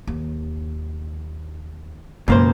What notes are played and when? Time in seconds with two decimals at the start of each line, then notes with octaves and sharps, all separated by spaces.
0.07 D#2
2.28 C#2 F#2 B2 A#3 C5